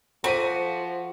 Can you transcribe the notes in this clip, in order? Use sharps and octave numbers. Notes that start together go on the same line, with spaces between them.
F3 F#4 A4 C5 B6 D#7